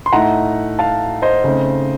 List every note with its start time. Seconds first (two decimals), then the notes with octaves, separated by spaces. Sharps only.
0.06 C6
0.13 A2 A3 D#4 F#5 A#5
0.79 F5 A5
1.22 C5 D#5
1.44 C#3 A3 C4 D#4